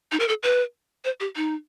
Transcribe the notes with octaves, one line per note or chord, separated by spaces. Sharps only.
D#4
A#4
A4
B4
C5
G4
D#4